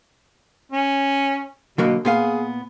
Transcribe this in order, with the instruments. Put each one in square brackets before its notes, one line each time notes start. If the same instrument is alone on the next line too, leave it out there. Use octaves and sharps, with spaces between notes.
[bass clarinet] C#4
[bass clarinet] B2 [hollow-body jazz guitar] D3 F#3 A#3
[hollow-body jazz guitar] A#2 B3 F5 [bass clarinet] G#4